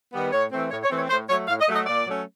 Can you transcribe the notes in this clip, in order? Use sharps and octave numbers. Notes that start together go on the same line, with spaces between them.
D#3 G3 B3
A2 C#5
E3 A3 C4
A2 C#5
C#5
E3 A3 C4
C#5
A2 C5
F#3 A3 C#5
A2 F5
D#5
F#3 A3
D#5
A#2 D5
F#3 A3 C#4